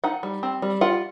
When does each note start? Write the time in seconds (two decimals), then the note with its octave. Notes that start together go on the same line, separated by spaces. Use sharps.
0.04 D#4 F#5
0.23 G3
0.43 C4
0.62 G3
0.81 F4 F#5